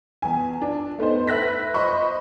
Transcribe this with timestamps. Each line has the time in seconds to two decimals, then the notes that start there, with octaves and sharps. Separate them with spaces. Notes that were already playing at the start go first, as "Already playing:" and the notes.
0.22 E2 G#5
0.62 D4
0.98 A3 B3 D#4 C5
1.27 B4 E5 F#6 A#6 B6
1.74 C5 D#5 B5 C#6